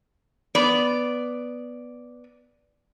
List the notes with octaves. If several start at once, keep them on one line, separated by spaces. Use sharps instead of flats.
B3 D5